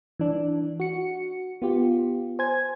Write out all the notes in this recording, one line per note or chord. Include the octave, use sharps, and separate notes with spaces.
E3 D4
F#4 C#7
B3 F4 G4
C5 G#5 G#6